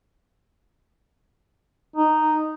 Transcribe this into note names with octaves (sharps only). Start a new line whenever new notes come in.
D#4